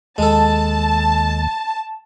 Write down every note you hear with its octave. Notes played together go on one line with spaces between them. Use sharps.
D#2 G#3 A4 A5